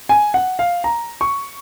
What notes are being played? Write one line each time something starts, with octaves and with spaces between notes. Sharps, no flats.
G#5
F#5
F5
A#5
C#6